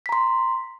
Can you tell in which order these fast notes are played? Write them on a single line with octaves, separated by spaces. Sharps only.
B6 A#5 C6